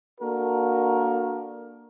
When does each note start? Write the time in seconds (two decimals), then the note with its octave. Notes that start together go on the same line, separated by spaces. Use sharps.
0.20 A#3 D4 F#4 A4 A#4